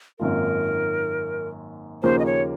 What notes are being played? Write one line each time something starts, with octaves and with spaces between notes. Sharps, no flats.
G#1 F#2 D#3 A#3 F4 A#4
D#2 C#3 F3 A#3 C#4 C5
D#5
C#5